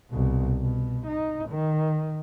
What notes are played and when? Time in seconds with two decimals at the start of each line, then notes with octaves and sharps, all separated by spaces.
0.10 C2 B2
0.61 B2
1.07 D#4
1.50 D#3